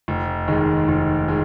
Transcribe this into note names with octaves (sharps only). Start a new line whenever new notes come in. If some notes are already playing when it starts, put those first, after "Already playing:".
F1
D#2 D#3 G#3
F1
D#3 G#3